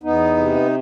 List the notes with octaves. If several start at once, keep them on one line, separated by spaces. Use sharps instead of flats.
E2 B3 D#4
C3